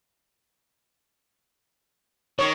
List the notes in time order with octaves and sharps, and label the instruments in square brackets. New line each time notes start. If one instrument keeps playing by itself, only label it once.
[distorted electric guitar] D#3 [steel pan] C#5